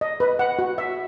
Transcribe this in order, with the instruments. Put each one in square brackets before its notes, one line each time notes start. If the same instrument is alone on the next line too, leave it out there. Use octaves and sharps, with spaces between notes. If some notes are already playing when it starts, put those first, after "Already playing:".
[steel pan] D#5
B4
F#5
F#4
E5